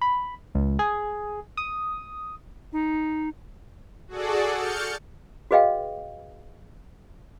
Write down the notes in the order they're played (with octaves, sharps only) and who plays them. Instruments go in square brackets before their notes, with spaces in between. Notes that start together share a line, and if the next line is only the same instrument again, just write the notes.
[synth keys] B5
C#2
G#4
D#6
[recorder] D#4
[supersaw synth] F#4 G#4 A4 D5
F6 G6 A6 C#7
[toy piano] F#4 G#4 B4 D#5 F5 G5